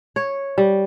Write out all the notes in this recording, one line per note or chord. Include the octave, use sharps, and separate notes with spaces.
C#5
G3